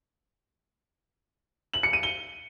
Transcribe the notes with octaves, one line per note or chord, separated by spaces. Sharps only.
F#7
C#7
D#7
G7